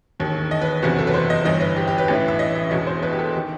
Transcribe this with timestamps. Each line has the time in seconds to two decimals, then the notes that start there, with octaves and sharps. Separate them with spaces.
0.20 E1 D#2 D#3
0.51 D#5
0.61 B4
0.82 F#1 E2 C3 F#4
0.98 A4
1.07 B4
1.14 C5
1.30 D#5
1.45 G1 G2 E3 D#5
1.61 B4
1.76 G4
1.87 G4
1.98 B4
2.08 A1 A2 E3
2.28 E5
2.39 D#5
2.55 E5
2.71 E1 E2 B2 D#5
2.87 C5
3.03 B4
3.13 G4
3.19 A4
3.34 D#3 G4